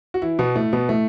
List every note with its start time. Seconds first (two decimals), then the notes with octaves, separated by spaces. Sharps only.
0.14 F#4
0.22 E3 E4
0.39 B2 B3
0.55 A2 A3
0.73 B2 B3
0.89 A2 A3